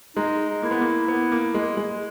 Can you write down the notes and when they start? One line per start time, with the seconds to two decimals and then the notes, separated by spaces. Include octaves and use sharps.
0.16 G#3 D#4
0.62 A#3 E4
0.71 B3
0.81 A#3
1.08 B3
1.32 A#3
1.55 G#3
1.77 G#3